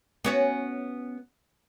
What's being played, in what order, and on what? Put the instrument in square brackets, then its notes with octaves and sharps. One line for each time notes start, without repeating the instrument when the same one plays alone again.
[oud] B3 C#4 F#4